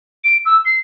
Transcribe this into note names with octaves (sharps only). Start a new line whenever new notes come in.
D7
E6
C7